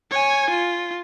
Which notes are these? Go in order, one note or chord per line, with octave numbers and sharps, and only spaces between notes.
C#5 G#5
F4